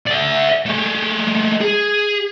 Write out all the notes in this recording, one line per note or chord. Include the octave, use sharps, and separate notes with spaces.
D5 E5
G#3 A3
G#4